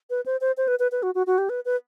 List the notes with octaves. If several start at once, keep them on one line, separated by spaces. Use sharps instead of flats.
B4
C5
C5
C5
B4
B4
B4
F#4
F#4
F#4
G4
B4
B4